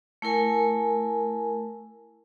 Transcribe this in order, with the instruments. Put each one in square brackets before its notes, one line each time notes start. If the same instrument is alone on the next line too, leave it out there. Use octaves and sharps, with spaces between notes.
[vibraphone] A3 E4 A#4 G#5